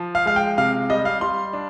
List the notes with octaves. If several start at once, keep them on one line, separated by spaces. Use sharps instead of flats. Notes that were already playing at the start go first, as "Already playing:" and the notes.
Already playing: F3
F5
G#3 F5
G5
C3 F5
G3 D#5
F5
G3 C6
D4